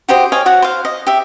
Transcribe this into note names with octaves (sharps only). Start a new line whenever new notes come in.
F#4 G4 C5 D#5
C#5 D#5 F5 G#5
F#4 C#5 F#5
C5 F5
D#5
G4 E5